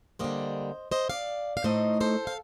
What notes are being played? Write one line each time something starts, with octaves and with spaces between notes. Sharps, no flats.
D3 G3 A#3 C5 D#5
C5 D#5
D5 F5
F5
A2 A3 D#4 C5 D#5
A4 C5
F5